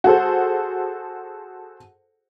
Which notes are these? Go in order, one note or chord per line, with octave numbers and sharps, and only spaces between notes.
F#4 G#4 A4 C5